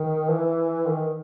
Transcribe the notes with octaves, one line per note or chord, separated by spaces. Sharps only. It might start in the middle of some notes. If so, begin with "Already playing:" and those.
Already playing: D#3
E3
D#3